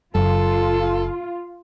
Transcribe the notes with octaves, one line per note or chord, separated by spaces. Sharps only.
F#1 F#2 F4 A4